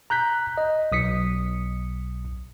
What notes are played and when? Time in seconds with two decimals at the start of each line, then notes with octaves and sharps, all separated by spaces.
0.10 A#5 F#6 G6 B6
0.57 D#5
0.92 B1 D#6 B6 C#7